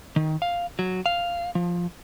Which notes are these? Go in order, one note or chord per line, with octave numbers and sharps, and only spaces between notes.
D#3
F5
F#3
F5
F3